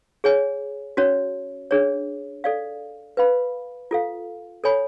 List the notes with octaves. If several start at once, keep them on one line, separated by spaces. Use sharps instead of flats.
G#4 C#5 G#5
C#4 F#4 C#5
D4 G#4 C#5
A4 D5 F5
B4 F5 B5
F4 A4 F5
A4 C#5 G#5 B5